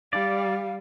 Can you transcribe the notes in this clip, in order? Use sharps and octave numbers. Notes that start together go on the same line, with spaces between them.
G3 D5 F5